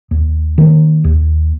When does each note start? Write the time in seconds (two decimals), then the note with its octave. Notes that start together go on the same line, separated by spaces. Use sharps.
0.11 D#2
0.58 D#3 A#3
1.04 D#2